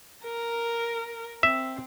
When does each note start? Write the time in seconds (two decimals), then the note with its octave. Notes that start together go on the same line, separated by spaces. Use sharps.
0.23 A#4
1.43 C4 E5